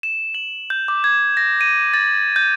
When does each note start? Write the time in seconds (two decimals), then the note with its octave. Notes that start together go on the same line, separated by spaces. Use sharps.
0.03 E7
0.34 F#7
0.70 G6
0.88 D6
1.04 G#6
1.37 A#6
1.61 D#7
1.94 A6
2.36 G6